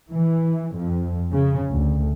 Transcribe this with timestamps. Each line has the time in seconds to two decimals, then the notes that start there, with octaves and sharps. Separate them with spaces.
0.11 E3
0.74 F2
1.32 C#3
1.71 D2